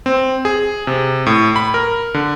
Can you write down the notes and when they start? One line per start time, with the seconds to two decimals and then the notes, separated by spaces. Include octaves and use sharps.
0.06 C4
0.45 G#4
0.87 C3
1.26 A2
1.56 B5
1.74 A#4
2.14 D3